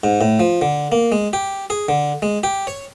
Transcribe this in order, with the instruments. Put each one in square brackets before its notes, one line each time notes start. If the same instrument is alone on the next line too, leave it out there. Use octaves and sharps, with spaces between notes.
[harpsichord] G#2
A2
F3
D3
A#3
G#3
G4
G#4
D3
G#3
G4
C#5